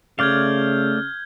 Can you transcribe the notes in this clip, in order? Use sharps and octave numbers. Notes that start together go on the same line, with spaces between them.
C#3 A3 D5 F5 F6 G6 G#6